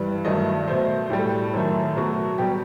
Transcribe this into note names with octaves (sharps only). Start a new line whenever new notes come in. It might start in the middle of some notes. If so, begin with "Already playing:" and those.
Already playing: G2 E3 G3 B4
G2 D#3 F#3 A3 D#5
B2 A3 C5
A2 G3 G4
A4
G4
F#2 D#3 A3
B2 F#3 A3 F#4
B2 G3 G4